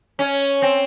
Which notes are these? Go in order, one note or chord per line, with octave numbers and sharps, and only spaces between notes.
C#4
C4